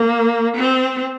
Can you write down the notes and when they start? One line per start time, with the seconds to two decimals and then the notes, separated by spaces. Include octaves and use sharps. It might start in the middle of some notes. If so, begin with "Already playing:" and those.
Already playing: A#3
0.57 C4